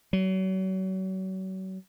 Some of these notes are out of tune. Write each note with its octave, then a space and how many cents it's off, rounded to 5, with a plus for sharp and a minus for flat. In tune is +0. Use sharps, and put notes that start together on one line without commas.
F#3 +35